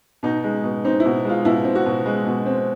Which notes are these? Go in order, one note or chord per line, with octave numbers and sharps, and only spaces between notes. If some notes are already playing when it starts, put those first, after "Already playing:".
B2 D#4
G#3
B2
C4 D#4
E4
B2
G#3 F4
B2 E4
C4
F#4
B2
G#3
B2
C4